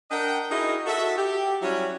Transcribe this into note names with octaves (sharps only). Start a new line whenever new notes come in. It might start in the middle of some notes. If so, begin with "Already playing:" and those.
D4 A#4 D#5 F#5 G5
D#4 E4 F#4 G#4 A#4 D#5
F#4 A4 E5
G4
F#3 G3 C#4 E4 F#4